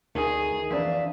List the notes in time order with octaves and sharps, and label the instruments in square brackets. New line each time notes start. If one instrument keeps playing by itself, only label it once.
[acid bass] D2 [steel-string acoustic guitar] D#3 [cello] G#4
[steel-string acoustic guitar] F2 D4 [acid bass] E3 [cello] E5